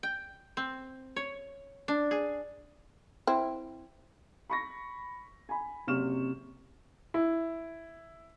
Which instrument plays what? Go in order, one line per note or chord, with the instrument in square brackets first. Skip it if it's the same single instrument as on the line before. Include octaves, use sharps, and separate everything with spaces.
[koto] G5
C4
C#5
D4
G#4
[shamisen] C4 E4
[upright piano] B5 C#6 A#6
G#5 B5
F#1 C3 C#6 F6 E7
E4